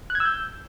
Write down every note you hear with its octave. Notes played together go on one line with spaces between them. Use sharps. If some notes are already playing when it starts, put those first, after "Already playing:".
F#6
G#6
E6
G6